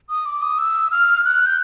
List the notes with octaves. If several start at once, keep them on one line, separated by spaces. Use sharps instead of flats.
D#6
D6
D#6
E6
F6
F#6
G6